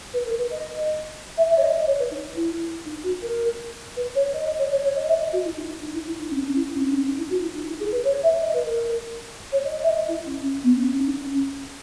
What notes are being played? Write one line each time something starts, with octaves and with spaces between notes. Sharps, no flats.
B4
A#4
B4
D#5
E5
E5
C#5
D#5
D#5
C#5
B4
D#4
E4
D#4
F#4
A#4
B4
C#5
D#5
D#5
C#5
C#5
C#5
D#5
E5
D#5
F#4
E4
D#4
D#4
E4
E4
D#4
C#4
C#4
E4
C#4
D#4
C#4
D#4
E4
F#4
E4
D#4
E4
G#4
B4
C#5
E5
D#5
B4
A#4
C#5
D#5
E5
D#5
E4
C#4
B3
C#4
C#4
D#4
C#4